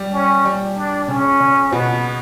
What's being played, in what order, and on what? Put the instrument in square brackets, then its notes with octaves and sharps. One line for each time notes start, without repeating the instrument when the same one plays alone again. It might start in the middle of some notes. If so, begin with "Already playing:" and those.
Already playing: [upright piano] G3
[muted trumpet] C#4
[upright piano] G3
[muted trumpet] D4
[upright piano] C#3 [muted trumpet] C#4
[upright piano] C#3
[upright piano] B2 [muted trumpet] B3